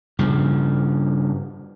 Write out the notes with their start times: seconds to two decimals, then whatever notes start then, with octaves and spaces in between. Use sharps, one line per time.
0.19 G2 C#3 F3